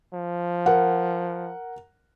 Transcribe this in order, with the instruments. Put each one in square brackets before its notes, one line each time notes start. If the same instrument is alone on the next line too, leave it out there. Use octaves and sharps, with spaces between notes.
[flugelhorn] F3
[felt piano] A#4 F#5